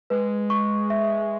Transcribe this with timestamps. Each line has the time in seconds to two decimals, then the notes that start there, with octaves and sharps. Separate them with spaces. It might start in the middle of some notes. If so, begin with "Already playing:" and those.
0.10 G#3 B4
0.50 C#6
0.90 E5